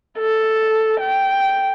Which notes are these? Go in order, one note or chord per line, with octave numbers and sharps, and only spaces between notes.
A4
G5